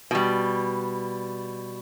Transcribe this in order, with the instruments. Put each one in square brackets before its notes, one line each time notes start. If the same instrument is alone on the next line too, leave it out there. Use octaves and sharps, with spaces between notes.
[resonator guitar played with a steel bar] B2 G3